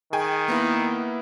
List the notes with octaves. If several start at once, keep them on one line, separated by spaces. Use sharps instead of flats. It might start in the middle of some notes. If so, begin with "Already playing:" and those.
D#3 G#4 G5 G#5
A#3 B3 E4